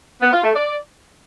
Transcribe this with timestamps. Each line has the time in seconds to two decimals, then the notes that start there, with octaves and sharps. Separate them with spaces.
0.22 B3
0.33 F4
0.44 A3
0.55 D5